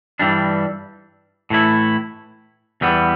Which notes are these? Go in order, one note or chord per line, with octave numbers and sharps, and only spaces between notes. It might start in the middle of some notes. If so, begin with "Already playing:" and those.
G2 E3 G3 D4
A2 E3 A3 E4
E2 E3 G3 B3